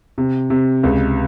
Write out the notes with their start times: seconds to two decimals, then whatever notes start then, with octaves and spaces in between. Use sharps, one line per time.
0.18 C3
0.50 C3
0.83 C#2